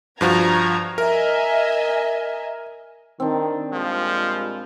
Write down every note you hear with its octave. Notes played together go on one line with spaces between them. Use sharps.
G2 F3 F#4 A#5 G#6
A#4 D#5 E5 G#5
D#3 C4 D4
A#2 F3 G3 G#3